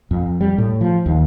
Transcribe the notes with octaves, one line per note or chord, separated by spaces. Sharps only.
F2
G3
A2
F3
D#2